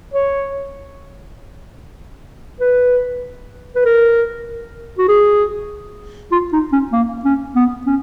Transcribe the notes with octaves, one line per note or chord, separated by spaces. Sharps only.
C#5
B4
B4
A#4
F#4
G#4
F4
D#4
C#4
A#3
C#4
B3
C#4